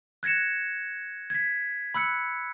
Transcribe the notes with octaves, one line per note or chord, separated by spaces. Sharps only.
F#6 G#6 A#6 C#7 E7
G#6 B6
B5 E6 F#6 C#7